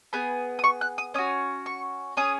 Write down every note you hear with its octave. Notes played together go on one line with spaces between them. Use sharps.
B3 G#4 B5
D#6
C#6
F#6
D#6
C#4 F#4 D#6
C#6
C#4 G#4 D#6